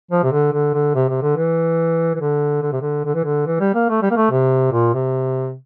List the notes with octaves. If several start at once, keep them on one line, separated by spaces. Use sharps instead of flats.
F3
C3
D3
D3
D3
C3
C3
D3
E3
E3
D3
D3
C3
D3
D3
E3
D3
E3
G3
A#3
A3
G3
A#3
A3
C3
A#2
C3